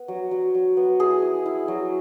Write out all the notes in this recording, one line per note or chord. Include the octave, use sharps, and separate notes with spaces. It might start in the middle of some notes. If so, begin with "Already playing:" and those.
Already playing: B3
F#3
F#3
F#3
B3
E4 G#4
E4
E4
F#3